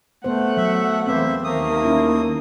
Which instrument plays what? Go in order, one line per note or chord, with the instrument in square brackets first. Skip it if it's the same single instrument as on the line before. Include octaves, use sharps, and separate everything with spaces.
[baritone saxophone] A3 [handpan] B3 C5 [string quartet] F#5
[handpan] F#3 [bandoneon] E5
[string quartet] E2 C5 [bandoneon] A#3 E5 [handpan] C4 B4
[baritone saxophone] D#2 [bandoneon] A3 D#6 [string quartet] A#3
[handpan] C#4 E4